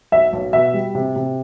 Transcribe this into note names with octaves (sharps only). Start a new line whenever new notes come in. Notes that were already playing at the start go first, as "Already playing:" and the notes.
B1 E5
B1
B2 E5
G3
C3
C3